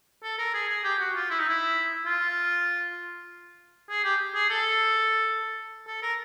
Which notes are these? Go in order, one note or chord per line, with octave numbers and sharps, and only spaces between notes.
A4
A#4
G#4
G#4
G4
F#4
F4
E4
D#4
E4
F4
G#4
G4
G#4
A4
A4
A#4